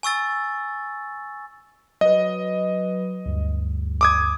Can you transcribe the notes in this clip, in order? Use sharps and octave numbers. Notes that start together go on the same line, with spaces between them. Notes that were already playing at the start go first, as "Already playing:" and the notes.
G#5 C#6 E6 A6
F#3 B4 D#5
D2 G2
D6 D#6 G#6